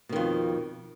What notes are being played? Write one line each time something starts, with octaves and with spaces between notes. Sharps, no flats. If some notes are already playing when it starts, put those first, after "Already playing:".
F2 B2 D#3